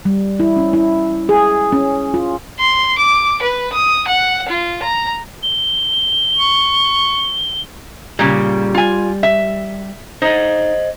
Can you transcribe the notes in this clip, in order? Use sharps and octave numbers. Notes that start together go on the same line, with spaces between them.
G3
E4
C#4
E4
G#4
C#4
F4
C6
D6
B4
D#6
F#5
F4
A#5
G7
C#6
A#2 C#3 G3
F4 G#5
E5
D#4 C5 D#5